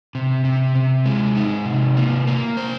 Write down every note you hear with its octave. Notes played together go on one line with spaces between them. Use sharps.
C3
C3
C3
G#3
D#4
C3
A#3
A#3
C5